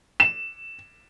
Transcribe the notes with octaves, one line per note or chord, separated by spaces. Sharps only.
E7